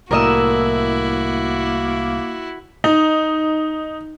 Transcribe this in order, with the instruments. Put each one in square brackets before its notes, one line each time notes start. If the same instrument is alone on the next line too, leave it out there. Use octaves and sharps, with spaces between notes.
[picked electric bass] C2 A2 [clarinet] A#3 [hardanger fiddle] E4 F#4 [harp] A#4 D#5 E6
[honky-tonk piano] D#4